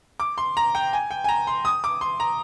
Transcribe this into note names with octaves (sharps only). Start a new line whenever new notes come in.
D6
C6
A#5
G5
G#5
G5
G#5
A#5
C6
D#6
D6
C6
A#5